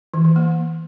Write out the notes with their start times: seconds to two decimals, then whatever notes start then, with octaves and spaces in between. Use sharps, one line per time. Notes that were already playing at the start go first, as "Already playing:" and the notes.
0.14 E3
0.25 E3
0.36 A#3